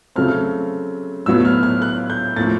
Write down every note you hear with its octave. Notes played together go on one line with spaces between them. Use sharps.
C#3 F#3 A3 C4 F6
A2 F#3 B3 E6
F6
F6
F#6
G6
A2 F3 A#3 A6